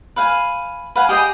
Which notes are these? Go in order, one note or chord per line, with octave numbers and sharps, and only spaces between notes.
B4 F5 G#5
B4 F5 F#5 G#5
G4 G#4 D#5 G5